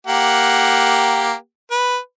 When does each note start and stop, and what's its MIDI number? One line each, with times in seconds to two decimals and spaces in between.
0.07 1.33 58
0.07 1.33 67
0.07 1.33 78
1.71 1.97 71